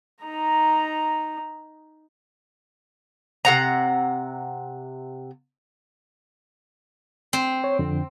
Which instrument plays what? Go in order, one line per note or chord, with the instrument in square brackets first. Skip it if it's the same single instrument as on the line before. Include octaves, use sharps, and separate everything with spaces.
[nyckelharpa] D#4 A#5
[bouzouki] C3 F#5 A#5
[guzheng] C4
[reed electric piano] C#5
F2 D3